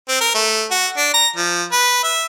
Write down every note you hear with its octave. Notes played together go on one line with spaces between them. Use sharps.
C4
A#4
A3
F#4
D4
A#5
F3
B4
E5